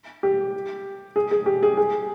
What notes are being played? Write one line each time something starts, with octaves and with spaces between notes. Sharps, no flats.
G4
G#4
G#4
G4
G#4
G#4